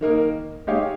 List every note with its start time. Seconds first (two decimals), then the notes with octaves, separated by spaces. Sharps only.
0.01 D#3 A#3 D#4 A#4
0.67 G#3 D#4 G4 C#5 F5